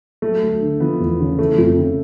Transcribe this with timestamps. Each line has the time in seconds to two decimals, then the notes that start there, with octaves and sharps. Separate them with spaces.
0.22 F#3 A3
0.42 D2
0.61 D3
0.80 F3 B3
1.00 E2
1.20 C#3
1.38 E3 A3
1.58 F2
1.78 C#3